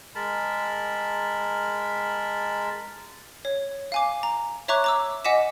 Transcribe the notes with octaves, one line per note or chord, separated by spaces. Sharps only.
G#3 A#4 A5 B5
C#5
F5 G#5 D6
A#5
C#5 E5 A#5 C#6 D6 F#6
A#5 D6 E6
D#5 F#5 G#5 D6 B6 E7